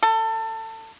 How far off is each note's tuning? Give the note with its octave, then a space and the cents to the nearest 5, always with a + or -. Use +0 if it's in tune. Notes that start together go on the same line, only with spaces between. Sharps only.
A4 +25